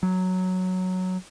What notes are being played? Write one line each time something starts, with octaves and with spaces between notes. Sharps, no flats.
F#3